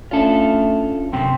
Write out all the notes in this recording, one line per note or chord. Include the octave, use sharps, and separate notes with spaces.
A3 C#4 D4 F4 A4
F#2 C3 C4